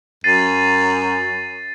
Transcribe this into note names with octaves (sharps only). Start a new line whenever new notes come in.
F#2 A6 C7 D#7